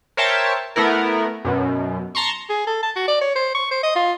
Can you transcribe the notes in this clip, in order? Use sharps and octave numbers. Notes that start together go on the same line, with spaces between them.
A#4 C5 C#5 E5 G5 A5
A3 B3 E4 A#4
F#2 B2
A5 A#5 C6 C#6
G#4
A4
A5
F#4
D5
C#5
C5
C#6
C5
D#5
F4